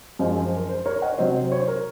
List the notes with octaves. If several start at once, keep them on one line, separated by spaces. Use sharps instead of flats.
F#2 F3 G#3 C5 D#5
C5
A#4
C5
A#4 C#5
D#5 F#5
C#5
C3 F#3 C4 C5 D#5
C5
C#5
C5
A#4